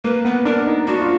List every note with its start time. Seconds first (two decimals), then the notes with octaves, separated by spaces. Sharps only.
0.04 A#3 B4
0.25 B3 B4
0.45 D4 A#4
0.67 D#4
0.87 D4 F#4
1.01 F4